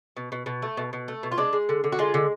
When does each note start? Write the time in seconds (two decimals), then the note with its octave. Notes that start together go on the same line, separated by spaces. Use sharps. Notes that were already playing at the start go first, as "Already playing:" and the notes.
0.17 B2
0.32 B2
0.46 B2
0.62 A3
0.77 B2
0.93 B2
1.08 A3
1.23 B2
1.31 F4
1.38 G#3 D4
1.53 G#3
1.69 D3
1.84 D3
1.92 F#4
1.99 G#3 F4
2.14 D3